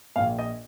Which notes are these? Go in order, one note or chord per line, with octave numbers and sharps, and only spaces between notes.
A#1 A#2 F5
D#5